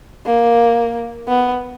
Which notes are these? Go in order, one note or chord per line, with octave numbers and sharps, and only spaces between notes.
A#3
B3